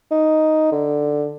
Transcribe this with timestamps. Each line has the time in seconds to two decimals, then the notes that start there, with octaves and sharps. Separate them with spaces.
0.11 D#4
0.72 D3